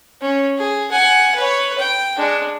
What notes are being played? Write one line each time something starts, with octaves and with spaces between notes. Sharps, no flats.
C#4
G#4
F#5 G#5
B4 C#5
G5
G#3 D4